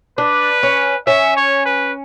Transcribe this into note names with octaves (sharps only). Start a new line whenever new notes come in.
D4 B4
C#4
C#4 E5
C#5
B4